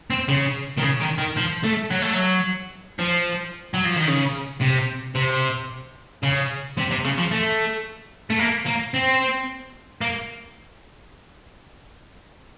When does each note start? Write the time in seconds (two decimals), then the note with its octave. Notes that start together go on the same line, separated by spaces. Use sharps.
0.10 C4
0.28 C#3
0.78 D#3
0.83 C#3
1.01 D#3
1.18 D#3
1.37 F3
1.64 A3
1.91 F#3
2.02 A3
2.13 F#3
2.99 F3
3.74 F#3
3.85 F3
3.96 D#3
4.07 C#3
4.61 C3
5.15 C3
6.23 C#3
6.77 C3
6.90 C3
7.04 C#3
7.18 F3
7.31 A3
8.30 A3
8.39 A#3
8.66 A#3
8.94 C4
10.01 A#3